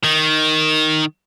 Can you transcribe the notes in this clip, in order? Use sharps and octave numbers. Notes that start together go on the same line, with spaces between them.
D#3